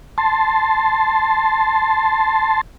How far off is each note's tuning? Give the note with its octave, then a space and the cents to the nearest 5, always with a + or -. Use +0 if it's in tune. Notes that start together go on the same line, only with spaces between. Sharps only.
A5 +0 C6 +0